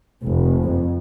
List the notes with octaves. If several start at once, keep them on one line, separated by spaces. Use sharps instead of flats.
F1
F2